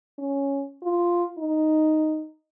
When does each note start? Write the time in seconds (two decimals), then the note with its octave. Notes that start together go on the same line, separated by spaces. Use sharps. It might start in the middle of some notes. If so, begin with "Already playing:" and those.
0.18 C#4
0.82 F4
1.38 D#4